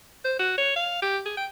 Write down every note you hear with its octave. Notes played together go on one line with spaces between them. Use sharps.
C5
F#4
C#5
F5
G4
G#4
G5